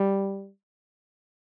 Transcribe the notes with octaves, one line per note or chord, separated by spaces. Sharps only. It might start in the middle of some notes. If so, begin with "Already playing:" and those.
Already playing: G3